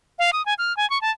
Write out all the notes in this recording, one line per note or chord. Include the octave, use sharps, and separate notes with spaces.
F5
D#6
G#5
F6
G#5
C#6
A5